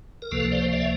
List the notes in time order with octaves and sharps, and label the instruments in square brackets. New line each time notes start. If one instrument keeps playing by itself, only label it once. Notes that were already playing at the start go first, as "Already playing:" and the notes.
[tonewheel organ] A#4
C#2 C3 F3 A#3 A4 B4
C5 D5
D5 E5